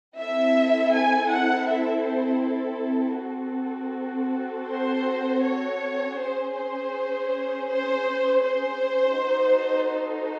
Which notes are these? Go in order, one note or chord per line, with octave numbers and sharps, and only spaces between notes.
C4 E4 A4 E5
G#5
F#5
E5
C5
A4
C4 F#4 A4
C5
C#5
C#4 G#4 C5
C5
C5
C5
D#4 F#4 A4
C5